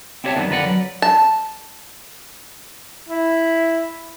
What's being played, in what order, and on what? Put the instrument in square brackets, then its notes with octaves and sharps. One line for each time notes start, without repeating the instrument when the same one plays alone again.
[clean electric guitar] C4 E4 G4 C#5 E5 A5
F#2 D#3 G3 B3 D4
F2 D3 A#4 B4 D5 F#5
F#3
[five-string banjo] A5
[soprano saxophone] E4